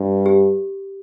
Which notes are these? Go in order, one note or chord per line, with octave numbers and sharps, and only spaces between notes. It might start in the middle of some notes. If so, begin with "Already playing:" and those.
Already playing: G2
G4